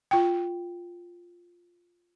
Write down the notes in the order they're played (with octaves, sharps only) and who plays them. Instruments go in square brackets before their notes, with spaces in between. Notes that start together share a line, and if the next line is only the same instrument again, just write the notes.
[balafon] F4 G5